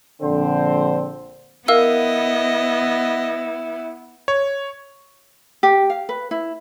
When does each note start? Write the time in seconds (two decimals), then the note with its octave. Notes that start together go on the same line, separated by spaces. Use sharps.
0.23 A#1 D3 C4 C5
1.68 B3 E4 A#4 D#5 F5 E6
4.28 C#5
5.63 G4
5.90 F5
6.09 B4
6.31 E4